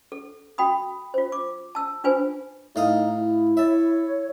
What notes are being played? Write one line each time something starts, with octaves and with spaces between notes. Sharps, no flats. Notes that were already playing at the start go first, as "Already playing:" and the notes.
A4
F#4 G5 B5 D#6
F4 C5
D6
A5 E6
D4 F4 B4 C5 G#5
A2 D#4 F5 D#6
E4
C#5 E5 A5